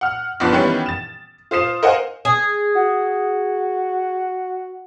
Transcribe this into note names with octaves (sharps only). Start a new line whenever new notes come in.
F#5 F6
F#1 F3 B3 D4
D#3 E3 G3 B3 C#4
A6 E7
F4 C5 D#6 C7 E7
A#4 C5 D#5 F5 F#5 G#5
G#4
F#4